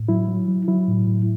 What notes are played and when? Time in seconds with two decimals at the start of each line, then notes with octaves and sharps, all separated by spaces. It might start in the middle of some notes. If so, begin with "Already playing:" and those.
Already playing: A2
0.09 F#3 E4
0.28 F#3
0.48 F#3
0.68 F#3 E4
0.88 A2
1.07 A2